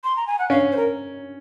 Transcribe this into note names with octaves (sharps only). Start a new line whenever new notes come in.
C6
A#5
G#5
F#5
C#4 F5
C5
A#4